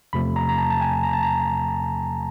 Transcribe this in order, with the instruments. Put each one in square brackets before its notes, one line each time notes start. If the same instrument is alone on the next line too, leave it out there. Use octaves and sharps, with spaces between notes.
[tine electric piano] E2 C3 F3 A3 B5
A#5
A#5
A5
A5
G#5
A#5
A5
A#5